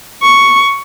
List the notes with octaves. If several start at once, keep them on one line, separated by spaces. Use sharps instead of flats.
C#6